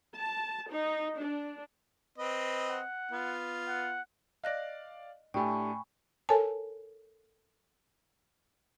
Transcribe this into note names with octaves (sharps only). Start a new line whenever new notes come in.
A5
D#4
D4
C4 B4 D#5
F#5
B3 F4
F#5
D5 D#5 F5 F#6 A#6
A2 A3 D4 G4 G5 G#5 B5 C#6
A4 A#4 C#5 G#5 A5